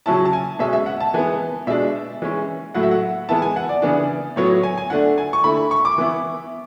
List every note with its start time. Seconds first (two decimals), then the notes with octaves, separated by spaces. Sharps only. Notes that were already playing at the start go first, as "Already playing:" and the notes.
0.06 C#3 F#3 C#4 E4 A5
0.25 A5
0.33 G#5
0.59 B2 G#3 C#4 E5
0.73 E5
0.86 F#5
1.00 A5
1.14 E3 G#3 B3 G#5
1.67 B2 G#3 D4 E5
2.22 E3 G#3 C#4
2.74 A2 F#3 A3 E4 F#5
2.83 E5
2.91 F#5
3.29 E3 G#3 B3 E4 A5
3.42 G#5
3.56 F#5
3.69 D5
3.82 C#3 E3 B3 D4
4.36 A2 F#3 B3 C#5
4.50 C#5
4.63 G#5
4.77 G#5
4.90 D3 A3 D4 F#5
5.18 G#5
5.33 C#6
5.44 D3 A3 E4 B5
5.57 B5
5.71 C#6
5.85 D6
5.98 E3 B3 E4